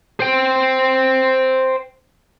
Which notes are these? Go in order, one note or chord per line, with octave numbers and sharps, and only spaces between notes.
C5 G5